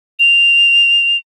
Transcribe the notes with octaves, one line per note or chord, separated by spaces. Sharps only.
F7